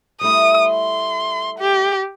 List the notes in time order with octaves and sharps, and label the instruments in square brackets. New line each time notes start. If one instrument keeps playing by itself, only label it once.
[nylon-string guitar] G3 A3 E4 [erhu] D#6
[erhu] C6
G4